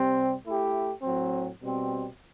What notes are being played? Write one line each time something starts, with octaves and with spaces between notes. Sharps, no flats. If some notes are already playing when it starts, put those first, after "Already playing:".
Already playing: C3 G3 C4
A3 E4 G4
A2 F#3 C4
B2 G3 C4